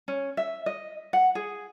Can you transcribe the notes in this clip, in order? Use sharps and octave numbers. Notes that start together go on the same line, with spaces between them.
C#4
E5
D#5
F#5
G#4